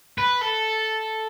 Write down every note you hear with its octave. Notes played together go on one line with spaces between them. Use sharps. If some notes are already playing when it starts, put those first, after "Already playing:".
B4
A4